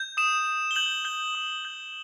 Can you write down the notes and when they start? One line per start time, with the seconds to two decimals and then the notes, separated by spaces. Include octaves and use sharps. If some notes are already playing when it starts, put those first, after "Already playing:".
Already playing: G6
0.17 D#6 E7
0.47 D#6
0.71 G7
0.76 G6 F#7
1.05 G6 G7
1.35 D#6
1.65 G6